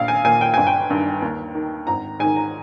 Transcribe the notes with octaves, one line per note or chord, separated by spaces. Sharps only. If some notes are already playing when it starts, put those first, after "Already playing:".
Already playing: A#1 F5
G#5
A#2 G#5
G5
G1 G#5
G5
G2 D#3
D#2
D#3
G#1 A#5
G#2 D#3 G#5
A#5